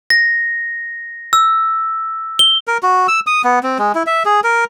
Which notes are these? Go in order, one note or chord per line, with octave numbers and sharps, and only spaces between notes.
A#6
E6
G7
A#4
F#4
E6
D#6
B3
C4
G#3
E4
E5
G#4
A#4